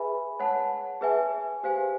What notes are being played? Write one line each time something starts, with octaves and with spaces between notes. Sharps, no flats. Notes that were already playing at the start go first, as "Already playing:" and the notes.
Already playing: G#4 B4 E5 G#5 B5
C#5 F#5 A5
G#4 B4 E5 G#5
G4 C5 F5 G#5